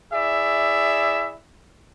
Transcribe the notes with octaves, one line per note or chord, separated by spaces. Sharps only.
E4 G#4 D5 E5